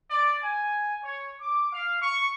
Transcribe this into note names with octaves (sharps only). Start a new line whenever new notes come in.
D5
G#5
C#5
D6
F5
C#6